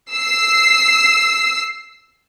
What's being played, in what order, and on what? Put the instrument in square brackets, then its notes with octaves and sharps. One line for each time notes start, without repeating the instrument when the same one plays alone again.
[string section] E6 C7